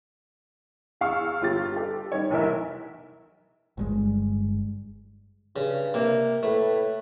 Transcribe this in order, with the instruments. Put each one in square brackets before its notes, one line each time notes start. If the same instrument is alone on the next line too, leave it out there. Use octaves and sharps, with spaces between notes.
[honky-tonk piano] E2 F5 C#6 E6
G1 F4 G4 A6
G4 A4
D#3 G3 C#5
F1 B1 E3 A#4 E5
[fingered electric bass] G1 G2 G#3
[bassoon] G2 [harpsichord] C#3
[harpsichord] C3 [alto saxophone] A#3
[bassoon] A2 [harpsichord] A3 [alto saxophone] B4